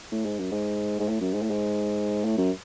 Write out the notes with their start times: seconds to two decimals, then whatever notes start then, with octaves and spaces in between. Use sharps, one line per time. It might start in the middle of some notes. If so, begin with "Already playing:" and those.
0.12 A2
0.25 G#2
0.39 F#2
0.52 G#2
0.99 G#2
1.09 A2
1.21 F#2
1.34 G#2
1.42 A2
1.50 G#2
2.24 A2
2.37 F#2